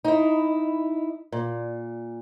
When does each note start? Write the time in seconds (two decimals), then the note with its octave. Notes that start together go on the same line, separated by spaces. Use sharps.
0.05 D#4 E4
1.32 A#2